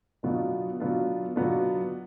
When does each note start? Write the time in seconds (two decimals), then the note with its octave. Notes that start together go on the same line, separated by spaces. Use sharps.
0.23 B2 F#3 B3 D4 F4
0.80 B2 F#3 B3 D4 F4
1.36 B2 F#3 B3 D4 F4